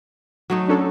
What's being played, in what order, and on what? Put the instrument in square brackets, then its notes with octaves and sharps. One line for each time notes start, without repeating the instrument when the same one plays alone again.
[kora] F#3 A3 D#4
[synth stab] C#4 D4 A4